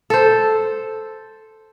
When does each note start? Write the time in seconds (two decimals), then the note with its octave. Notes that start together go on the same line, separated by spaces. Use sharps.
0.10 A4 C5